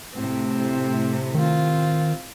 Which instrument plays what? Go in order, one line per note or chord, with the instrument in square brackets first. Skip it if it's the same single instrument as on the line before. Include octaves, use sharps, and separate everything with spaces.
[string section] A2 C3 [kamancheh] C4
[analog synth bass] D#3 [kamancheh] C4 F4